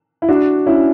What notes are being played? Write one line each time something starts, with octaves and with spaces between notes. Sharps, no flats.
E4
D4 F#4
C#4 E4